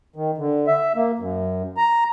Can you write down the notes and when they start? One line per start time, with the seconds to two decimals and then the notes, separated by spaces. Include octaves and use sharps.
0.16 D#3
0.38 D3
0.67 E5
0.96 A#3
1.19 F#2
1.77 A#5